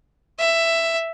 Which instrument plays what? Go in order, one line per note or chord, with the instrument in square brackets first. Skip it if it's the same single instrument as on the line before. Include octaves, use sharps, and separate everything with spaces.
[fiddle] E5